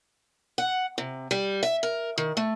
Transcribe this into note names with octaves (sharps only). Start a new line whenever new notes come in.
F#5
C3
G3
E5
A#4
D#3
A3